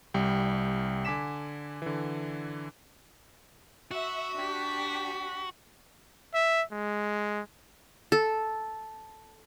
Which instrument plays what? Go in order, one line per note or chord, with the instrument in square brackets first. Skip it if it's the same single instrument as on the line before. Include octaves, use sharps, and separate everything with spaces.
[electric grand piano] C2 G3 G5
D3 G#5 D6 B6 E7
D3 E3
[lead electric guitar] F#4 [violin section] E5
[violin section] D4 G4 B6
[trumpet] E5
G#3
[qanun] A4